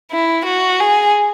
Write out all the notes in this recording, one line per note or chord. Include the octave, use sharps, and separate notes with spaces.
E4
F#4
G#4